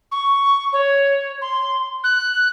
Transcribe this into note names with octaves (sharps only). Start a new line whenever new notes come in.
C#6
C#5
C6
F#6